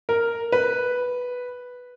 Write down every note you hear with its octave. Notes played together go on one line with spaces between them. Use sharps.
A#4
B4